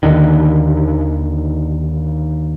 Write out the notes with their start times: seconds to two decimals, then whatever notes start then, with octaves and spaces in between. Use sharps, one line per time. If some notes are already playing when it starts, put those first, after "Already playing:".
0.03 D#2 D3 D#3